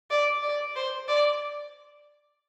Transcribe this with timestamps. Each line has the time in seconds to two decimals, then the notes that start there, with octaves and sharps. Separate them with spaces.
0.10 D5
0.42 D5
0.76 C5
1.08 D5